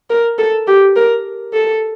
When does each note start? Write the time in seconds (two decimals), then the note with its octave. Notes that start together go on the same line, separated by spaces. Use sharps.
0.10 A#4
0.39 A4
0.67 G4
0.96 A#4
1.54 A4